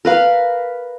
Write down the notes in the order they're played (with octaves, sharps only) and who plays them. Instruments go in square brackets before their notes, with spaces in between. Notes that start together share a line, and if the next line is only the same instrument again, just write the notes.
[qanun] A#4 B4 F5